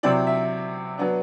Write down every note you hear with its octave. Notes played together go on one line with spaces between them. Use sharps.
C3 F#3 C4 E4 D5
E5
F#3 B3 D4